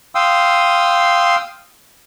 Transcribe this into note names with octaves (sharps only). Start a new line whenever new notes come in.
F5 G5 C6 D#6 E6